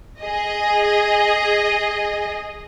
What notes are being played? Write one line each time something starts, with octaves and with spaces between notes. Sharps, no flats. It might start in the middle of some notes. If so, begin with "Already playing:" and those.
G#4 D#5